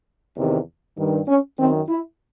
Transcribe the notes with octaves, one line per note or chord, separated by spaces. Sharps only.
E2 C3 D#3
G2 D#3
C#4
F#2 D#3 C4
E4